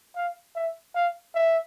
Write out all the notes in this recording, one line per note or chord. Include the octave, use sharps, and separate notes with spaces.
F5
E5
F5
E5